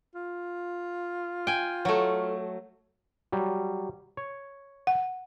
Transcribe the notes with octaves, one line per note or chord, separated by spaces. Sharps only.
F4
G5 G#5
F#3 A3
F#3 G3
C#5
F#5